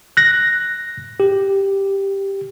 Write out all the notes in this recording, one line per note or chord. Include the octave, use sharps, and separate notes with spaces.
F#6 A#6
G4